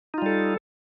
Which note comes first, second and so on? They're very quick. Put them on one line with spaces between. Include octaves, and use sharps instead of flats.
D#4 F4 G3 A4